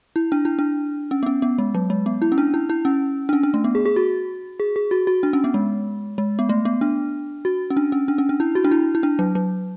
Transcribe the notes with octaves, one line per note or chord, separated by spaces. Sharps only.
E4
D4
E4
D4
C#4
B3
C#4
B3
G#3
F#3
G#3
B3
E4
C#4
D4
E4
E4
C#4
D4
C#4
D4
A3
B3
G#4
G#4
F#4
G#4
G#4
F#4
F#4
D4
C#4
B3
G#3
G#3
B3
A3
B3
D4
F#4
C#4
D4
C#4
D4
C#4
D4
E4
F#4
D4
E4
E4
D4
F#3
F#3